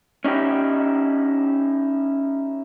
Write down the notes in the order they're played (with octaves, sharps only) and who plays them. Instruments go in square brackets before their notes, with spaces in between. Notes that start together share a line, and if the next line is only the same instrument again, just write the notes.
[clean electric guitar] C#4 D#4 E4 G4